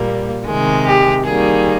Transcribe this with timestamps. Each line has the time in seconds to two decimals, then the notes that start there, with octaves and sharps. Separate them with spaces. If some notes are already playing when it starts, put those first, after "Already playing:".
Already playing: A#2 G3 A#3
0.45 C3 D#3 G#3
0.85 G4
1.25 D#3 G3 A#3 G#4